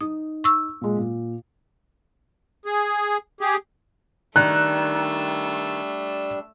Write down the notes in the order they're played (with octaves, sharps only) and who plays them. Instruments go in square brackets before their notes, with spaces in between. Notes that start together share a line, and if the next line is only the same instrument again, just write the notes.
[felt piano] D#4 [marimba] D#6
[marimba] C#6 E6
[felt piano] A#2 G#3
A#2
[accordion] G#4
G4 G#4
[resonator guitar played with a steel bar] D#3 [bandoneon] G3 D4 [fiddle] A3 E6 [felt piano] F#6